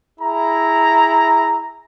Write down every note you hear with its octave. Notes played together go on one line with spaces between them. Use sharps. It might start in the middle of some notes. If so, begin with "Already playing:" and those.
E4 G#4 A#5